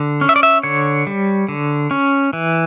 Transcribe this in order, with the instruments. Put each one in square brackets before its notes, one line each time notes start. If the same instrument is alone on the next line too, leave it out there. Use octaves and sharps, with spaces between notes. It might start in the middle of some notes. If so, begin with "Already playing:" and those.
Already playing: [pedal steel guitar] D3
C#4
E5
D5
E5
D3 C#5
G3
D3
C#4
E3